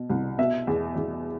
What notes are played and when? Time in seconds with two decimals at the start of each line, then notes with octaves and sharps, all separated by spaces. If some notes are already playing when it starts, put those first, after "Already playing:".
Already playing: B2
0.10 C2
0.38 B2 E5
0.67 E2
0.96 E2